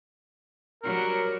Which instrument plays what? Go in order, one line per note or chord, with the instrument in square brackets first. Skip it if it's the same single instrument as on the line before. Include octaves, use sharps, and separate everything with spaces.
[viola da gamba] F#3 G3 [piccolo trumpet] A#4